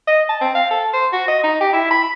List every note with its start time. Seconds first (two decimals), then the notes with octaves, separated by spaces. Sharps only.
0.07 D#5
0.29 A5
0.41 C4
0.55 F5
0.71 A4
0.93 C5
1.13 F#4
1.28 D#5
1.43 D#4
1.61 G4
1.73 E4
1.91 B5